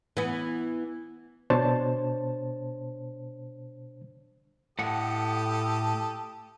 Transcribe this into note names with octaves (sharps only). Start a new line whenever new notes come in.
E3 B3
B2 D4 C5 C#5 A5
A2 G4 A4 F#5 D#6